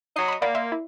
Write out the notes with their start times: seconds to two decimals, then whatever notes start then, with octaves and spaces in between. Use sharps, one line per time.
0.16 F#3 D#5 C7
0.28 B5 D#6
0.42 A#3 D5 F#5 B5
0.55 E5 C6
0.72 E4